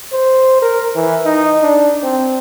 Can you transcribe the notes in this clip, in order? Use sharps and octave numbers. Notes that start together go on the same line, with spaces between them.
C5
A#4
E3
D#4
D4
C4